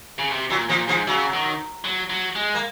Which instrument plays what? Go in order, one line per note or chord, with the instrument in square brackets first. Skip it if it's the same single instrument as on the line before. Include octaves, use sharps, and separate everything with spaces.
[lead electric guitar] C#3
C3
[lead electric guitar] A#2 [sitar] F#3
[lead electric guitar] A#2 [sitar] F3
[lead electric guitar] G#2 [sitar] F3
[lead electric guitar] C#3 [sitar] F#3
[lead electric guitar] D#3
F#3
F#3
G#3
[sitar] A#3